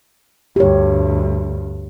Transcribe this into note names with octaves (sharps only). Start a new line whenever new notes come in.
D2 G2 G4 C#5